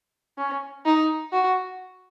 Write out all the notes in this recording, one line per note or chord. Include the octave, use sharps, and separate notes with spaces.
C#4
D#4
F#4